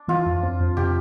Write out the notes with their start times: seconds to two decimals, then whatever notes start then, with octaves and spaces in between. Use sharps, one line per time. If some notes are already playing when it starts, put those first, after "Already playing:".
Already playing: D4
0.08 E3 F4
0.26 F2
0.43 C4
0.60 F2
0.77 C3 G4